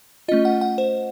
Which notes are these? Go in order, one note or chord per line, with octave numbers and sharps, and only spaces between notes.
A3 C#4 F4 D#5
F#5
F#5
C5